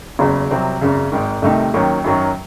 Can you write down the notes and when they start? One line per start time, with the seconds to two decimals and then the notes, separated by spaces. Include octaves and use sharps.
0.19 F#1 E2 C#3 F#3
0.50 C2 C3 F#3 C4
0.81 G#1 F#2 C#3
1.12 G#1 G#2 D#3
1.42 C2 C3 D#3 A3 D#4
1.74 D#2 D#3 F#3 C#4
2.04 F#2 D#3 F#3 C#4